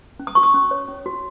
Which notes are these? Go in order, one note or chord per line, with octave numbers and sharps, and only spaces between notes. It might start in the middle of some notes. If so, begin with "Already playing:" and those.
C#4
D#6
F#4 C#6
D#6
C#4
C#5
C#4
F#4